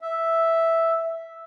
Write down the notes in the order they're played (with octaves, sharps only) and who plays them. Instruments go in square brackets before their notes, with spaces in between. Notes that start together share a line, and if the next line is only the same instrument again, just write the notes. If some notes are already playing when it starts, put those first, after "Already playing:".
[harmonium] E5